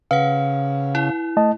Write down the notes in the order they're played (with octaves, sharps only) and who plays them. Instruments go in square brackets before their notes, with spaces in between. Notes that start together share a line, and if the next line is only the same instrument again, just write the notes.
[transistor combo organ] C#3 [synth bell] B4 F#5 [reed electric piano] F5
[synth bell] E4
[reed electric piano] A3 D#5 A5